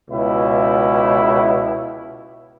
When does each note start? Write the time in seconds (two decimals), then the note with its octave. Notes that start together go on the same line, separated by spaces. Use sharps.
0.10 C#2 B2 E4